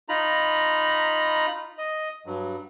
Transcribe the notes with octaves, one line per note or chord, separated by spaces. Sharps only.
D#4 F4 A#5 B5
D#5
G2 F#3